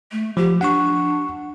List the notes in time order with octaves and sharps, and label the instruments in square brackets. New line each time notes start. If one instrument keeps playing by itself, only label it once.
[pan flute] A3
[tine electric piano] F3 [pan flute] G4
[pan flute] D4 [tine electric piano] F#5 C#6